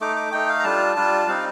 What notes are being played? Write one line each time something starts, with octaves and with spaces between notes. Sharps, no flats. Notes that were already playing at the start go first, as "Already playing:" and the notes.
A3 D#4 D6
D6
A3 D#4 G5
F5
A#5
G3 D4 F4 A5
G3 D4 F4
G3 C4 D#4 F5